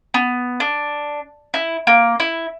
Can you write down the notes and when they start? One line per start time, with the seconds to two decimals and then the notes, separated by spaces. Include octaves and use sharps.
0.14 B3
0.60 D4
1.54 E4
1.87 A#3
2.20 E4